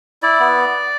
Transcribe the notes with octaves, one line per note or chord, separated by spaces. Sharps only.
E4 D5
B3